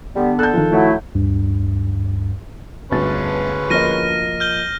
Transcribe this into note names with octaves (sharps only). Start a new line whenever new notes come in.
D3 G3 B3
A4 F#6 G6
D#3 F3
F#3 A3 E4
D2 G2
G1 D2 G#3 C#4 B4 A5 A6
F3 A#3 D#5 F6 A#6 D#7
F6 G6 G7